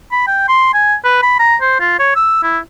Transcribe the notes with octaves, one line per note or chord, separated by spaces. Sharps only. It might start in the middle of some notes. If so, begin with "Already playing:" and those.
B5
G5
C6
G#5
B4
B5
A#5
C5
F4
C#5
E6
E4